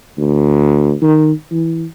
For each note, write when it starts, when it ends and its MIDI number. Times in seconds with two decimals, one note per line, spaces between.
0.18 0.94 38
1.02 1.32 51
1.51 1.85 52